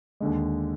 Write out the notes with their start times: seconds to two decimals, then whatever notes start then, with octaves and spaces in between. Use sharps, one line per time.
0.20 D#2 D3 G#3